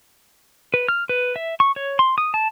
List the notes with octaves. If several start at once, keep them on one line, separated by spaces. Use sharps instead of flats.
B4
F6
B4
E5
C#6
C#5
C6
D#6
A5